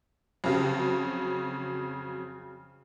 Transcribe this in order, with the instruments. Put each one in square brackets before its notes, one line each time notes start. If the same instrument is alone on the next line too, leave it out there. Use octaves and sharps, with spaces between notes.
[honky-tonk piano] F2 C#3 F#3